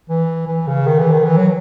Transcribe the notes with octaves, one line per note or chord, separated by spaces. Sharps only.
E3
E3
C#3
D#3
E3
D#3
E3
F#3